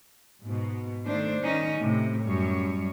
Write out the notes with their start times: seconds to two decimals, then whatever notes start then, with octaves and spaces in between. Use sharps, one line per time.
0.43 G#2 B2
1.06 D#3 A3 D4 C5
1.42 D#3 G3 C#4 D#4
1.78 A2 C3
2.22 F#2 G3 C#5